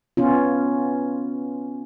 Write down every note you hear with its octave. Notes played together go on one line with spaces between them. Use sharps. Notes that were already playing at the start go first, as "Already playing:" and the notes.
B3 C#4 F4